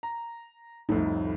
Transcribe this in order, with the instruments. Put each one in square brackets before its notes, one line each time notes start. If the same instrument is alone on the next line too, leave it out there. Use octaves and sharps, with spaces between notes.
[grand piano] A#5
[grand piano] C2 F2 [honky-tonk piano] A2 A3 [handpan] D#4